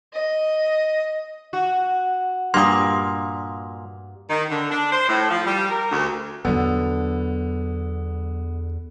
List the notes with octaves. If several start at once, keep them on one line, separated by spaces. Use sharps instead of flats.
D#5
F#4
G2 A#2 G3 A#3 C6 D#6
D#3
D3
D4
C5
A2
F3
G3
A#4
D2
E2 D3 F#3 B3 D4